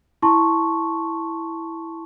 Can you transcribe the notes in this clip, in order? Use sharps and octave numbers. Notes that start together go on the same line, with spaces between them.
E4 A5 C6 C#6